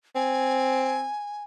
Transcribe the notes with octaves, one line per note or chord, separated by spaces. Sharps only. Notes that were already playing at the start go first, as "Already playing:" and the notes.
C4 G#5